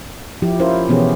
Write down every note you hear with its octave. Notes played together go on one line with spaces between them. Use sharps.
F3 E4 G4
C#4 E4 F4 A#4 C5
B2 E3 B3 C#4 G4 G#4